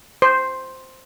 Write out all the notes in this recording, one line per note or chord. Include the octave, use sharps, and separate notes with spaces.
C5